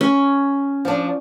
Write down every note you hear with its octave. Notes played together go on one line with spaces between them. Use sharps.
C#4
F3 D4